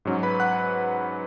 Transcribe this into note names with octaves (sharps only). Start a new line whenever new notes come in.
G#2 F#3 C#4
B4 B5
F#5 F#6